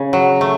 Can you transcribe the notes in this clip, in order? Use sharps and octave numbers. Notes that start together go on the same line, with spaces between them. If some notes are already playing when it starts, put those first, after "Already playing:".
Already playing: C#3
F#3
A3